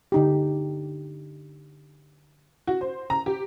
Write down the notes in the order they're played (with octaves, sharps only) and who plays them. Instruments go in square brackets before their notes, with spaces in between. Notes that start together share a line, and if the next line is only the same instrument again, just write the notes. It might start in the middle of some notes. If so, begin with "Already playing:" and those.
[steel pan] D3 D#4 G4
[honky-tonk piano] F#4
C5
A#5
G4